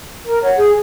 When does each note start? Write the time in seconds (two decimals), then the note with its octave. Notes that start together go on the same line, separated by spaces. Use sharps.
0.24 A#4
0.42 C#5 F#5
0.58 G#4